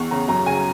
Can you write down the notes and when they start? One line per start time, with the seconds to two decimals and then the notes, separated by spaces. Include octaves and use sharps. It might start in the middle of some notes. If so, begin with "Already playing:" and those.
Already playing: E2 C#6
0.11 C#3 A#5
0.28 F#2 A#5
0.46 C#3 G#5